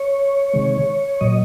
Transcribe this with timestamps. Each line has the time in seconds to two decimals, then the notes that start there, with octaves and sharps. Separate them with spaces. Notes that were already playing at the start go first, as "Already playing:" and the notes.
Already playing: C#5
0.54 C3 D#3 G#3
1.21 A#2 F#3 D#5